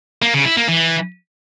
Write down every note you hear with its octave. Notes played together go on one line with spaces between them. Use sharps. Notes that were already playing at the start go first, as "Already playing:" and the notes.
A#3
C#3
E4
A#3
E3